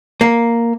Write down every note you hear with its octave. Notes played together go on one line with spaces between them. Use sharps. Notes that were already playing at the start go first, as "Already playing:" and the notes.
A#3